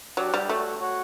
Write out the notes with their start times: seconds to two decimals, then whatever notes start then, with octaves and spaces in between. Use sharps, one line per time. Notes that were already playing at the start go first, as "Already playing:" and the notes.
0.17 F#3 D4 G4 D5 F#5
0.34 G3
0.49 A3 F#4 C#5 F#5
0.80 F#4 C#5 F#5